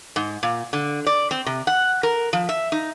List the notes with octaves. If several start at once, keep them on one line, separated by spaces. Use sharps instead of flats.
G#2
A#2
D3
D5
C4
C3
F#5
A#4
F3
E5
D#4